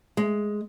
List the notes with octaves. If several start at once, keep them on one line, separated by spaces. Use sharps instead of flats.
G#3